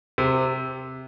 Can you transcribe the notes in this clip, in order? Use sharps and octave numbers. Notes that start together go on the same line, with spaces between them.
C3